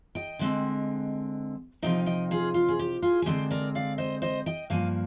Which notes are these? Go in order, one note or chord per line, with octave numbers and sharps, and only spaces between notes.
D#5 G5
D3 G#3 C4
C3 F3 C4 D#4 D#5 G5
D#5 G5
F4 G#4
F4
G#4
G4
F4 G#4
G#4
D3 G#3 C4 G4
A#4 D5
D5 F5
C5 D#5
C5 D#5
D#5 G5
G2 F3 A#3 F5 G#5